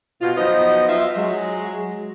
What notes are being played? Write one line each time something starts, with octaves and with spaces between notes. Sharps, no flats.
B2 F4
F3 F#3 B3 D#4 C5 D#5
F4 E5
F#3 G#3